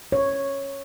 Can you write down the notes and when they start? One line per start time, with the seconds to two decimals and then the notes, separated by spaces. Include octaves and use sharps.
0.12 C#5